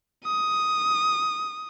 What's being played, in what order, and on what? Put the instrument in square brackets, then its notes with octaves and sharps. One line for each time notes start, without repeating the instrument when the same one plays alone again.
[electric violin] D#6